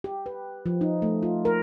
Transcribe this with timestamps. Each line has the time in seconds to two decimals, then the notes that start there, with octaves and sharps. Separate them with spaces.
0.04 G4
0.26 B4
0.66 F3
0.81 D#4
1.02 A3
1.23 F4
1.45 A#4